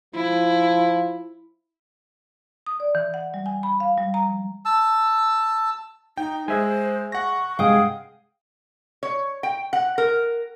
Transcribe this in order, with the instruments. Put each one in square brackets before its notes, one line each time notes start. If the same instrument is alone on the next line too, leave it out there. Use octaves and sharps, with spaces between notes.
[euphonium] F3 [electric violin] E4
[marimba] D#6
D5
E3
F#5
G3
G#5
B5
F5
G3
A#5
F3
[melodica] A5 E6
[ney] D#4 [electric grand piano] G5
[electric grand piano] G#3 [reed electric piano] G#4 E5 G#5 [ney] C5
[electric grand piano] F#5 A#6 [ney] C#6
[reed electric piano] G2 C3 G#3 [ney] G#4 [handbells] F5 G5 D#6
[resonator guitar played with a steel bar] C#5
G5
F#5
A#4